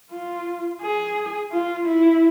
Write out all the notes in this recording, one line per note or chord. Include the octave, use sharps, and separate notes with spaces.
F4
G#4
F4
E4